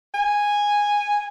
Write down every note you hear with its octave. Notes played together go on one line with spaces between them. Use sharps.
G#5